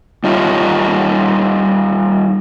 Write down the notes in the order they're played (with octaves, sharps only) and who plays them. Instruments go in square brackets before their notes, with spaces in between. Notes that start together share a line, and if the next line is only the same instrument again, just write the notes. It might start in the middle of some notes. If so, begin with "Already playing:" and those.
[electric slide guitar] G3 D#4 F4 C#5